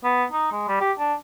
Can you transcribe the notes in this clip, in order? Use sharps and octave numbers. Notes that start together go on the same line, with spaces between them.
B3
D#4
G#3
G3
G4
D4